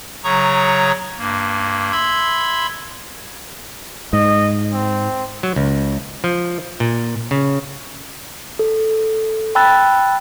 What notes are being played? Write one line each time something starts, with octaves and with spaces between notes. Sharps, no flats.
C#3 F#3 C#5 A#5 C#6 D#6
G2 A#3
E5 B5 C6 E6 G#6
G#2 D#5
C4
F#3
C#2
F3
A#2
C#3
A4
G5 A5 B5 E6 F#6 A6